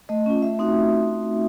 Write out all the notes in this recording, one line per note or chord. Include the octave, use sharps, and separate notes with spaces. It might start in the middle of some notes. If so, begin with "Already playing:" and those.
A3 D#5
C#4 F4
A3 E5
C4 D#4 F#4